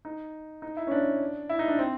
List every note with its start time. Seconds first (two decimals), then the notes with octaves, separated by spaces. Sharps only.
0.05 D#4
0.62 D#4
0.77 E4
0.87 C#4
0.91 D4
1.49 E4
1.59 D#4
1.68 D4
1.79 C4